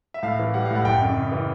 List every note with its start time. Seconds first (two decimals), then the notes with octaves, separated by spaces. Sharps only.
0.14 E5
0.23 A2 F5
0.39 E3
0.54 G3 F#5
0.65 F5
0.71 A2 F#5
0.85 F#1 G5
1.01 F#2
1.17 C#3
1.32 E3